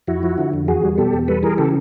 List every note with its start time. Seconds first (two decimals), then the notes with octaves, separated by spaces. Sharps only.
0.07 F2 E4 F#4
0.23 F3
0.38 D3
0.53 F2
0.68 E2 F#4 G#4
0.83 G3
0.98 B2 G4 A4
1.13 E2
1.28 G3 A4 B4
1.43 E3 G#4 A#4
1.58 C#3 G4 A4